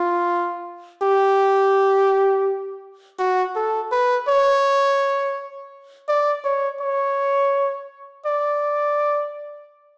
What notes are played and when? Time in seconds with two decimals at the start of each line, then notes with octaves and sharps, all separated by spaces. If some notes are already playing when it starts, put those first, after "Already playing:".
Already playing: F4
1.02 G4
3.19 F#4
3.55 A4
3.92 B4
4.28 C#5
6.08 D5
6.44 C#5
6.80 C#5
8.26 D5